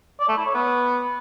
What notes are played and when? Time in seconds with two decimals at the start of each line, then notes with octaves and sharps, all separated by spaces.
0.20 D5
0.28 A3
0.37 E4
0.46 C#5
0.54 B3